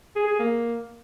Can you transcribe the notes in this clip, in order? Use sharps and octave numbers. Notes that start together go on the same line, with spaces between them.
G#4
G#4
A#3